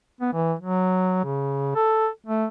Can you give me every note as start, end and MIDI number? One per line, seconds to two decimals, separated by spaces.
0.21 0.33 59
0.33 0.54 52
0.59 1.21 54
1.24 1.73 49
1.75 2.08 69
2.27 2.46 57